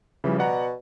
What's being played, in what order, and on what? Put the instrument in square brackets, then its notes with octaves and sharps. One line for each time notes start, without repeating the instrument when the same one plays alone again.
[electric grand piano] C#3 F3 G3 [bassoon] E3
[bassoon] B2 [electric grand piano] D5 F#5 A#5